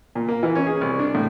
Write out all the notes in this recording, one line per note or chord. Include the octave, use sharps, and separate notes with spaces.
A#2
A#3
E3
C#4
G#4
C2
D4
A2